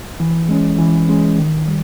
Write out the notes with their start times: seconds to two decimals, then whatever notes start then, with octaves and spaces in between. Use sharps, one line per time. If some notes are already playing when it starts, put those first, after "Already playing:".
0.20 E3
0.48 G#3 C#4
0.79 E3
1.08 G#3 C#4
1.38 D#3
1.68 G3